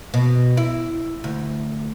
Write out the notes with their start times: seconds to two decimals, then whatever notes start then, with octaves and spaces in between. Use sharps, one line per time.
0.14 B2
0.57 E4
1.24 D2